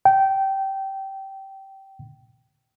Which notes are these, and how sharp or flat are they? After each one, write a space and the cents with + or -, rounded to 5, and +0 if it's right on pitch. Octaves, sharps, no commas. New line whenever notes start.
G5 -20